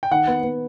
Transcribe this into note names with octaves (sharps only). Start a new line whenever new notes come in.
G5
D#3 F#5
B3
B3